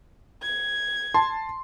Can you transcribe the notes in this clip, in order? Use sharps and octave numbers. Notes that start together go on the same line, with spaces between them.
G#6
A5 C6